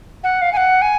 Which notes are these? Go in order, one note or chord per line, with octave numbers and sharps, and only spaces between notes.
F#5
F5
G#5
F#5
G#5